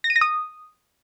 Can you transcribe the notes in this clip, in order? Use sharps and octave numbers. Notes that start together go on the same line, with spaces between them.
A#6
D#7
A#6
D#6